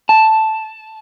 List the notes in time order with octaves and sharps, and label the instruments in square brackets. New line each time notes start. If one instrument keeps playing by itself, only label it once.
[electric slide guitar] A5